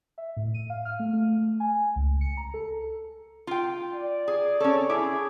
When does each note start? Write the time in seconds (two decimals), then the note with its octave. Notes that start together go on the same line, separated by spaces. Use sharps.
0.18 E5
0.37 A2
0.54 D#7
0.70 F5
0.85 F6
0.99 A3
1.13 A3
1.60 G#5
1.96 C#2
2.21 C#7
2.37 A#5
2.54 A4
3.47 F4 G5
3.93 D5
4.28 G#4
4.60 C#4 A4 C#5
4.90 E4 G#4 D6